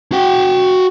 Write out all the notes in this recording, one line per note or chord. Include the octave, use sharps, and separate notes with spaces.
F#4 G5